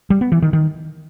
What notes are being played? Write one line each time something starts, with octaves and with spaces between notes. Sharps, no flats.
G3
B3
E3
D#3
D#3